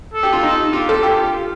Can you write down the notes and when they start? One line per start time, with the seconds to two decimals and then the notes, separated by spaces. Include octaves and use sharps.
0.13 A4
0.23 G4
0.33 F4
0.43 D#4
0.73 F4 G4
0.89 A4
1.03 F4 G4